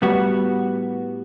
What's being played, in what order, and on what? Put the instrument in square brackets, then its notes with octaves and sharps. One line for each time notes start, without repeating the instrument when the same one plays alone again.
[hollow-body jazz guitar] A2 G3 B3 F#4